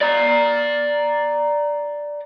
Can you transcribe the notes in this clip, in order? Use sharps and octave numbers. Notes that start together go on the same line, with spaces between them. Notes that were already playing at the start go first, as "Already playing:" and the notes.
D5 A#5